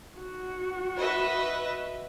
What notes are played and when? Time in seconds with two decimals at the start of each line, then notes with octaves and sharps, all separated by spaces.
0.18 F#4
0.97 B4 D#5 E5